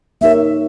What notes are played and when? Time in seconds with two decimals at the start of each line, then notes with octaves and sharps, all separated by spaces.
0.21 A#3 D#4 G4 A#4 C#5 E5